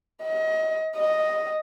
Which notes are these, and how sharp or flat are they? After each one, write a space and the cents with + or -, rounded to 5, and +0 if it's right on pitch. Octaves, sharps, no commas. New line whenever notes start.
D#5 +30
D#5 +0